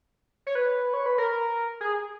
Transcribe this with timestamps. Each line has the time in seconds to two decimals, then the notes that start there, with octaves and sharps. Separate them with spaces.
0.47 C#5
0.55 B4
0.94 C#5
1.06 B4
1.18 A#4
1.81 G#4